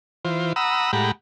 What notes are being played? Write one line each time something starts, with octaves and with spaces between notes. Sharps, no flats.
E3 F4 C5
F#5 A#5 B5 D#6 E6
A2 G#3 G4 F#5 A#5 B5